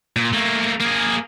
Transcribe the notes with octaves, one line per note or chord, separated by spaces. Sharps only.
A#2
A3 A#3
A#3 G#4